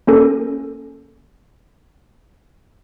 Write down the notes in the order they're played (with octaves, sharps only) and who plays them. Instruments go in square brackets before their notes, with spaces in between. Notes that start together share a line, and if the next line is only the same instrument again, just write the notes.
[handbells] A#3 C#4 A4 A#4